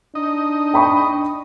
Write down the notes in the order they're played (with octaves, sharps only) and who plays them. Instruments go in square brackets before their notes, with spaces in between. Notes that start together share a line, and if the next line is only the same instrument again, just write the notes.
[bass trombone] D4 [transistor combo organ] D#4 D#5
[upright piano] G5 B5 C#6